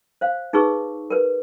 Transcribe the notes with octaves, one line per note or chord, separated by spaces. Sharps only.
C5 F5
D#4 G#4 B4 C#6 E6
A#4 B4